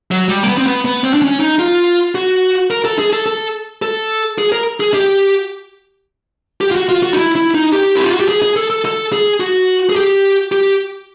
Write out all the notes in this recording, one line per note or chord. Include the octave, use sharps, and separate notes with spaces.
F#3
G3
A#3
B3
C4
B3
B3
C4
D4
C#4
D#4
F4
F#4
A#4
A4
G#4
A4
A4
A4
G#4
A#4
G#4
G4
G4
F4
F#4
F4
F#4
D#4
E4
E4
D#4
G4
E4
F4
F#4
G4
G#4
G#4
A4
A4
A4
G#4
F#4
G#4
G4
G4